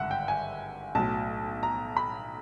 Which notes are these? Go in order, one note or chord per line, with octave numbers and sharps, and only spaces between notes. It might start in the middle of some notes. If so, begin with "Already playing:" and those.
Already playing: G#1 G2 D3 E5 F#5
G5
G#5
B1 A2 F#3 A5
A#5
B5